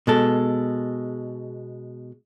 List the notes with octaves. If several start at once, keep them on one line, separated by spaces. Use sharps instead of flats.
B2 G#3 A4